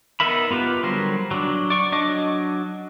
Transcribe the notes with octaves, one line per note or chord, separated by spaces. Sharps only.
B3 D#4 A#4 E5 B5
B3 F4 G4 B4
D3 F#3 G3 A#4 C5
F#3 D4
D5 C#6
F#3 D4 D#5 D6